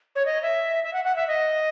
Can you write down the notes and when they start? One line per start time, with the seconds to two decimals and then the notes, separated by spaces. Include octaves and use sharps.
0.16 C#5
0.26 D#5
0.43 E5
0.84 E5
0.93 F#5
1.05 F#5
1.16 E5
1.28 D#5